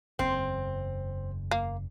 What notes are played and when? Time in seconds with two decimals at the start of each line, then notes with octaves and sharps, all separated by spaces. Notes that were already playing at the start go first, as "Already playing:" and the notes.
0.19 F#1 E2 C4
1.51 A#3